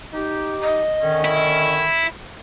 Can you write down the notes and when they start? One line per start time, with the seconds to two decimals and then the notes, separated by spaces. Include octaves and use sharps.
0.13 D#4 G4
0.63 D#5
1.02 D3 D#3 C#4
1.25 E4